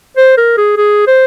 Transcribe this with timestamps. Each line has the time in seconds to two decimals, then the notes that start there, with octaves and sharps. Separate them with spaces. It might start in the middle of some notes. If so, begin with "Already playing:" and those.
0.17 C5
0.38 A#4
0.57 G#4
0.77 G#4
1.07 C5